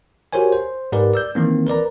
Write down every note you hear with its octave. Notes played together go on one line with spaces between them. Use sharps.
F#4 G4 A#4 C5 C#5 G#5
C5
G#2 G4 A#4 B4 D5
D5 E6 G6
D#3 E3 A#3 C4
A#4 B4 D5 A#5